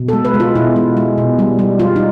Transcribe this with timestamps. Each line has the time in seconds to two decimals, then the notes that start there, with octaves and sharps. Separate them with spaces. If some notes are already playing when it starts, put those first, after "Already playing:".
Already playing: B2
0.08 G#3 A4
0.25 B4
0.34 G#3
0.40 F4
0.56 B2 E4
0.76 G#3
0.97 G#3
1.18 B2
1.39 G3
1.59 G3
1.79 G3 F4
1.96 D#4